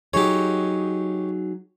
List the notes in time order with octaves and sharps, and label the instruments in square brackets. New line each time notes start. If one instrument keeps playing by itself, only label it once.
[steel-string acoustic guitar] F#3 D#4 G#4 [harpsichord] G4 C#5